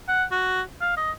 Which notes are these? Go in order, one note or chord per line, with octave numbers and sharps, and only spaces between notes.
F#5
F#4
F5
D#5